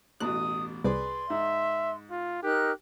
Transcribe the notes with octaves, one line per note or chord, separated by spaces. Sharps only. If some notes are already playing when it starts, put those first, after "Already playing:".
A1 E2 B2 D#6 F#6
C2 G#4 B4 D5 C6
G#2 E5
F4
D#4 G4 A#4 F#6